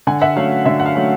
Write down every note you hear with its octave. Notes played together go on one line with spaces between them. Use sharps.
D3 F#5 G#5
E5 F#5
F#3 A3 C#4 F5
D3 E5
F#5
F5
F#3 A3 C#4